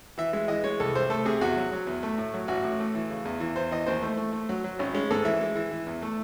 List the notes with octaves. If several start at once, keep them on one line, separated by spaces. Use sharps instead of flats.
E3 E5
G#3 E5
E3 D#5
G#3 C#5
C2 A4
C2 C5
A3 A4
C3 G#4
E2 F#4
F#3
F#3
E2
A3
A2
F#3
A1 F#4
A2
A3
E3
C#3
E2
E3
E2 C5
E3 D#5
D#2 C5
A3
A3
A3
F#3
F#3
G#1 C#4
G#3 C#4
G#2 A4
E3 E5
G#3
E3
E3
E2
A3